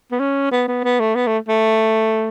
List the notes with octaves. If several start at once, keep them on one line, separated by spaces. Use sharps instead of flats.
B3
C#4
B3
B3
B3
A3
B3
A3
A3